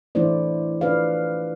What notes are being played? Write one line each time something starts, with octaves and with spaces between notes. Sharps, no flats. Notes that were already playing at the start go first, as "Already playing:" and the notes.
E3 A3 D4 E4 C5 D5
D4 F4 B4 D5 F5